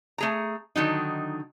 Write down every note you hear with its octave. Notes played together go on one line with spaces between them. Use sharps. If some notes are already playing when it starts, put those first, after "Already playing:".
A3 G#4 A#5
D3 D#3 F#3 D#4